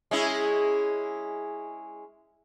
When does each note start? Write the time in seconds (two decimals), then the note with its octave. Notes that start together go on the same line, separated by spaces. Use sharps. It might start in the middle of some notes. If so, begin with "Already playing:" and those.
0.11 G#3 C#4 E4